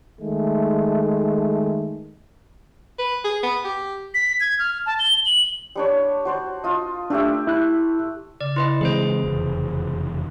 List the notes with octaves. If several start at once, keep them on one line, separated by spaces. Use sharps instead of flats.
D#3 G#3 A3
B4
G#4
B3
G4
B6
G#6
F6
A5
G7
F#7
G3 D4 C#5
F#4 C5 D5
F4 D#5
A3 D4 G4 E5
E4 F#6
C#3 D5
E4 B4 D#5 C6
E3 G#3 C4 G#4 B4 C5
F1 E2